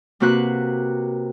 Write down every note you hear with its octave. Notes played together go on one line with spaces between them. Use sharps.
C3 A#3 C4 F#4 B4 F#6